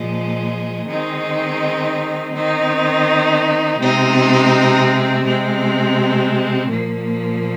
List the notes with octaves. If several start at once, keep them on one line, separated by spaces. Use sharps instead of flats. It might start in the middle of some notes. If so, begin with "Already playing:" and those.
Already playing: A#2 F3 G#3
D#3 G#3 C4 D#4
D#3 C4 D#4
C3 G#3 C4 D#4
C3 G#3 C4
A#2 F3 A#3